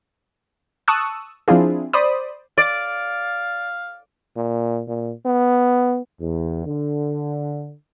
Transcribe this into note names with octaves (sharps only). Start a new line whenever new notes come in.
A5 C#6 D#6 E6 F#6
F3 C4 D4 E4 F4 G#4
C5 D5 B5 D#6
D5 F5
A#2
A#2
B3
E2
D3